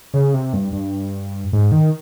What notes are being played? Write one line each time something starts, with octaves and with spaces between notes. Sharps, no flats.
C#3
C3
G2
G2
G#2
D#3